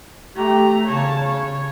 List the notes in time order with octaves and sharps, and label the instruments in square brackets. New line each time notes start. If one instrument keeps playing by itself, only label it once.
[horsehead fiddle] A3 A#5 [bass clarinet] G4
[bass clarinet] C#3 [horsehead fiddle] C#5 A5
[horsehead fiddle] C#5